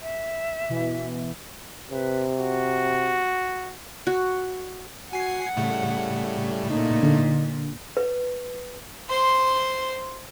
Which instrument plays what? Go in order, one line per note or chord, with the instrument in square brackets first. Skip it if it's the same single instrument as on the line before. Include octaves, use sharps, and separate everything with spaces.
[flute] E5
[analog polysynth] B2 E3
[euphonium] C3 [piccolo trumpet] B4
[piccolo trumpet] F#4
[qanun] F#4
[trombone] F#4 [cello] F#5 [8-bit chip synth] G#5 C7
[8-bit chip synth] A2 C#3 A3 [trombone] G3
[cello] A#2 [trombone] D#4
[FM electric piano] D3
[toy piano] B4
[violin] C5 C6